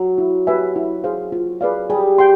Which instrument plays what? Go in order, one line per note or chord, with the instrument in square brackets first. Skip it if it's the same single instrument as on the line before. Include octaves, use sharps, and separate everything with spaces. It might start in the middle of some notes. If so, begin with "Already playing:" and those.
Already playing: [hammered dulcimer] F#3
[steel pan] E4
G4 B4 E5 G#5
E4
G#4 C5 F5
F4
G#4 B4 D5 F5
[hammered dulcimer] G3 [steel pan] G#4
[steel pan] G5 C6